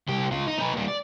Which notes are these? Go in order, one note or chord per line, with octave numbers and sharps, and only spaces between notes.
C2 G4
C#2 F4
D#4
D#4 B4
A#2 G3
D5